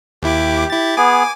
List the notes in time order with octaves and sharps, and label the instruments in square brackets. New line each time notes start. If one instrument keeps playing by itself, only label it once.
[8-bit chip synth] D#2 E4 D6 [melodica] G4
[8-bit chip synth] E4 A6
[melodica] B3 G#4 [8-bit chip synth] G#5 D6